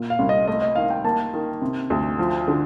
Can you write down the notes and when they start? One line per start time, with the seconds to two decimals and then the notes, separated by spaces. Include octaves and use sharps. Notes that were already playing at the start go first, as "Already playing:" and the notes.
Already playing: A#2
0.10 F5
0.19 C2
0.29 D#5
0.48 A3 D#5
0.62 D#5
0.75 D#3 F5
0.90 G5
1.05 A#3 A5
1.34 D#3
1.62 C3
1.90 D2
2.19 F3
2.48 D3